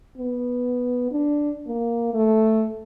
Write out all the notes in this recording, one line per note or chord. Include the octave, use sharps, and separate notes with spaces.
B3
D4
A#3
A3